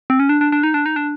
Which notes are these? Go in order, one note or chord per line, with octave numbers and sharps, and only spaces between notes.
C4
C#4
D4
D4
D4
D#4
D4
D#4
D4